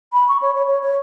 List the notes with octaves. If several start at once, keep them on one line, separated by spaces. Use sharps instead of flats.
B5
C#6
C#5
C#5
C#5
C#5